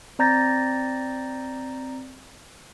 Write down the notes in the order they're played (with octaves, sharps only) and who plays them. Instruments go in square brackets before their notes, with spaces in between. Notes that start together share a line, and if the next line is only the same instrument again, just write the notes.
[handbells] C4 D5 A#5 G6 A6 A#6